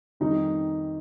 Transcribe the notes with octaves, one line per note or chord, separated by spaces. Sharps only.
F2 D#3 G3 D#4